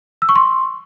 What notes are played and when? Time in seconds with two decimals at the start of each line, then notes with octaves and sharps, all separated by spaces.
0.22 E6
0.29 C#6
0.36 C6